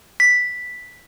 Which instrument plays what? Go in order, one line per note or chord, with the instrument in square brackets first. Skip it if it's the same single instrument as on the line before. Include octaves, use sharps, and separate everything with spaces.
[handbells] B6